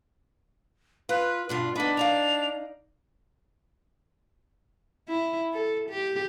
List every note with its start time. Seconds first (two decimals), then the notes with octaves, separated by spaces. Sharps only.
1.09 F4 B4
1.49 G2 B2 D4 F4
1.76 B3 D4 D#4 B5
1.97 D#4 D5 F5 F7
5.08 E4
5.53 A4
5.89 G4